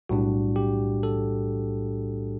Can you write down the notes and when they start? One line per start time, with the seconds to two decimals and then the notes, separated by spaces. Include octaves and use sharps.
0.09 B1 A2 G3 D4 F#4
0.56 G4
1.03 A4